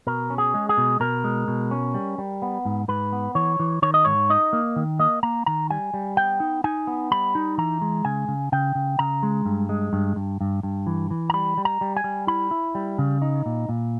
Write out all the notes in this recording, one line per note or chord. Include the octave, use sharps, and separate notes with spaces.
B2 A#4
C#4
G#4
G#3
G#4
B2
B2 A#4
G#3
B2
C#4
G3
G3
B3
G#2
G#2 B4
B3
E3 C#5
E3
D#3 C#5
D#5
G#2 C#5
D#4 D#5
A#3
D#3
A#3 D#5
A#3 A#5
D#3 A#5
G3 G#5
G3
B3 G5
D#4
D#4 G#5
B3
G3 B5
D#4
E3 A#5
G#3
C#3 G#5
C#3
C#3 G5
C#3
C#3 A#5
G#3
G2
G#3
G2
G2
G2
G2
E3
E3
A#5
G3 B5
G3
A#5
G3
G#5
G3
E4 B5
E4
G3
C#3
D#4
A#2
A#2